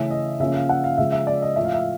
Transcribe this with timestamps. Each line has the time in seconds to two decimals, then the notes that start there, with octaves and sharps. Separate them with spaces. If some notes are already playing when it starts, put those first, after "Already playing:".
Already playing: C#3 E3 A3 C#4 E5
0.11 D#5
0.40 C#3 F3 A#3 C#4 E5
0.54 F5
0.69 F#5
0.84 F5
0.98 C#3 F3 G#3 E5
1.12 E5
1.27 D5
1.42 D#5
1.56 A2 F3 A3 E5
1.65 F5
1.73 E5